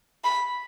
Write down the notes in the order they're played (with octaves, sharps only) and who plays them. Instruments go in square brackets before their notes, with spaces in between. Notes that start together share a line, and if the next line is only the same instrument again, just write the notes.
[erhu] B5